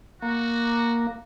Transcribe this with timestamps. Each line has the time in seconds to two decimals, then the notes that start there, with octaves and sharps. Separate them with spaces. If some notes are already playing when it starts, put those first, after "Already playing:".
0.22 A#3 F#4